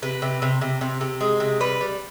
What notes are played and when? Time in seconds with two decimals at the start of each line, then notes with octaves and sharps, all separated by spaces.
0.02 C3 B4
0.22 C3
0.42 C3
0.61 C3
0.81 C3
1.01 C3
1.21 G#3
1.40 C3
1.60 G3 B4
1.81 G3